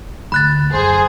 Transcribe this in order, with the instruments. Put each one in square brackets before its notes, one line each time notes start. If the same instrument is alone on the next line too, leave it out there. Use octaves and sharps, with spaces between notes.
[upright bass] D2 [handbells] B5 F#6 A6
[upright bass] F#2 [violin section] G#4 [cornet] C5